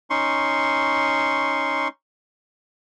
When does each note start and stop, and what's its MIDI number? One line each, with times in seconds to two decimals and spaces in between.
0.10 1.88 61
0.10 1.88 63
0.10 1.88 84
0.10 1.88 85